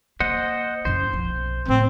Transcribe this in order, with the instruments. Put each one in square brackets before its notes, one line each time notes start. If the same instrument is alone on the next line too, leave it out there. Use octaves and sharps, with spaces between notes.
[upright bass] A#3 [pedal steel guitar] C5 D#5 F#5
[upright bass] F#2 E4 [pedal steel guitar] C5
[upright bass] B1 F3
[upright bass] A2 [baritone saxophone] C4